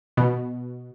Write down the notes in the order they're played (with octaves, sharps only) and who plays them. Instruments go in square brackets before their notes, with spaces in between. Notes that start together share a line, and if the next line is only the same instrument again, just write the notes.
[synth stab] B2